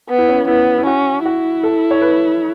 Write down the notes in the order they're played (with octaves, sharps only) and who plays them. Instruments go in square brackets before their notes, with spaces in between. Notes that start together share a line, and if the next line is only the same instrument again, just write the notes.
[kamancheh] B3
[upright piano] E4
C#4
[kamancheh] B3 [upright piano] E4
[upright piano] E4
[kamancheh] C#4 [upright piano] F#4
[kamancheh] E4 [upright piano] F#4
[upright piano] A4
C#5
B4